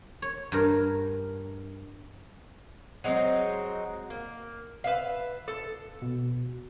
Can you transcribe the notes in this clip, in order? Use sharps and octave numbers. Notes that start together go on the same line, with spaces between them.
C#5
G2 A#4
F#3 G#3 C4 D#4
A#3
B4 E5 F5
A4
B2